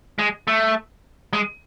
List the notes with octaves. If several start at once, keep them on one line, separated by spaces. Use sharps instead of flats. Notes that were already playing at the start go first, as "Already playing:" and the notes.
G#3
A3
G#3